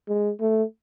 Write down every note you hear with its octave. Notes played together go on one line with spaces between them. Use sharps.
G#3
A3